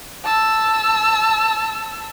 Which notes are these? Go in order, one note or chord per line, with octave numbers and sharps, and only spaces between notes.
A5 E6